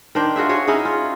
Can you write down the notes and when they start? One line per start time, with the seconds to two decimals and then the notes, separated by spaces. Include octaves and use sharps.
0.15 D#3 D4 C5 G5
0.36 F4 F#4 G#4 E5
0.49 F#4 G#4 C#5
0.67 C#4 D#4 E4 G#4
0.85 F4